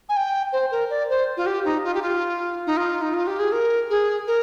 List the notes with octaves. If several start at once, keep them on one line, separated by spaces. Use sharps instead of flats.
G#5
G5
C5
A#4
D5
C5
F4
G4
D#4
F4
G4
F4
D#4
F4
D#4
F4
G4
G#4
A#4
G#4
A#4